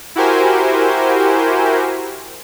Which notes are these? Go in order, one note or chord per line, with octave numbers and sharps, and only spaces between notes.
E4 F#4 G4 A#4 C5 G#5